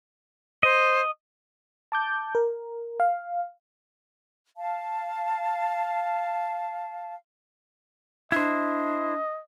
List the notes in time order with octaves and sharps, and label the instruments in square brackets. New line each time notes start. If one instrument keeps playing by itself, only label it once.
[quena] C5 [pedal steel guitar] D#5
[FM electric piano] A5 D6 G6
A#4
F5
[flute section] F5 A5
[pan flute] D4 [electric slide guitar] E4 C5 [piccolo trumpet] D#5